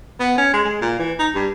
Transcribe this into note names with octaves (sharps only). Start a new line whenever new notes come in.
B3
C#4
G#3
G#3
A#2
E3
D#4
G2